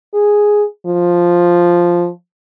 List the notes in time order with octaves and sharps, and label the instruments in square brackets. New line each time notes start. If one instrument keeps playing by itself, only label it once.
[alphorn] G#4
F3